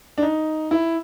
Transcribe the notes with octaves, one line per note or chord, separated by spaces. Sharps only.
D4
D#4
E4